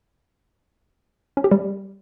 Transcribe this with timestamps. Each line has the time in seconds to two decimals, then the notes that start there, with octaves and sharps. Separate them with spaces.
1.37 C#4
1.44 G4
1.51 G3